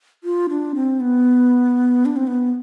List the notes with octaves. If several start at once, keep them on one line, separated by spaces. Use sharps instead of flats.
F4
D4
C4
B3
D4
C4
B3